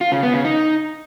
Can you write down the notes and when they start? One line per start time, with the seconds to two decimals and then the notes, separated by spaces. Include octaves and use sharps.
0.01 F4
0.12 C#3
0.23 B3
0.34 C#3
0.45 D#4